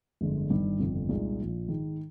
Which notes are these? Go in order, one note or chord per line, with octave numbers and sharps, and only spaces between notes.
G1 F2 D3 G#3
G1 G2 D#3
G1 F2 C3 F3
C2 A#2 G#3 D#4
A#1 A#2 F3
G#2 D#3 G#3